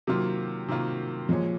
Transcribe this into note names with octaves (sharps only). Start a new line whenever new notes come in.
C3 D#3 F#3 A#3 F4
C3 D#3 A#3 F4
A#2 F3 G#3 C#4